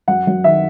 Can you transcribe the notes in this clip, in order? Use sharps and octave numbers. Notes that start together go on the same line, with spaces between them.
F#2 F#5
F#2
D#3 E5